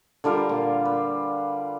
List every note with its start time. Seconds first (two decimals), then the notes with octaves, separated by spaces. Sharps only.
0.24 D3 G3 F4 A#4
0.49 A#2
0.85 B4